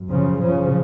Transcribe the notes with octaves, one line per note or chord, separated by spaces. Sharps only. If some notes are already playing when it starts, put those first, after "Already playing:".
Already playing: F#2
C#3 F3
C#3 F3